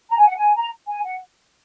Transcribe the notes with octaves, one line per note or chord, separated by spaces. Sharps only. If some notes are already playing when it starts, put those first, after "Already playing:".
A#5
G#5
F#5
G#5
A#5
G#5
F#5